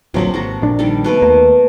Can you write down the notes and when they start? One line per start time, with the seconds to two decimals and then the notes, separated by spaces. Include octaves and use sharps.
0.14 D1 A#1 C3 F3 F#3 A#3
0.34 G#1 F#4 A4 A#5
0.61 A#1 A#2 D4
0.79 D#3 G3 A4
1.04 B2 A3 B4
1.22 D#2 A#3